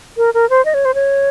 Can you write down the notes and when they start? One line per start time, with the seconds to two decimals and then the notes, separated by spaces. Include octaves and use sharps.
0.17 A#4
0.34 A#4
0.50 C5
0.65 D#5
0.74 C#5
0.85 C5
0.94 C#5